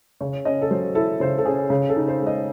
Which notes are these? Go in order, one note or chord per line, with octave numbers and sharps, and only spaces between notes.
C#3 C#5
C#4 D#5
A4
F#3 C5
E4 A4
C#3 C5
A4
C#4 G#4
C#3
A4
D#4
C5
G#3
D#5